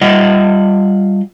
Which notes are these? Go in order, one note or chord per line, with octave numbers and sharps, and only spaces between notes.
G3 F4 D#5 E5 F#5